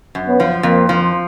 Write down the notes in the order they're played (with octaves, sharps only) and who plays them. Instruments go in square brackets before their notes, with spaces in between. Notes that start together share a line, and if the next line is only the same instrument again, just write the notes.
[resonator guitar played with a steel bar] F#2
[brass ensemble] B3 C#4
[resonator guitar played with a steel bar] F3
[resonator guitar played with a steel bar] F2 [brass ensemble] A#3 C4
[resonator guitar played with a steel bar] F3